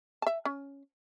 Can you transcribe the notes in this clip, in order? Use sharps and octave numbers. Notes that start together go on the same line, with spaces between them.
E5 A5
C#4